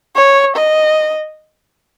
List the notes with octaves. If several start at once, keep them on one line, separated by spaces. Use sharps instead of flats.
C#5
D#5